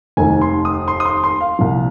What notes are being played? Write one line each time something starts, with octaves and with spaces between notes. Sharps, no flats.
F1 D#2 D#3 G#5
C6
D#6
C6
D#6
C6
C6
F5
C2 A#2 F3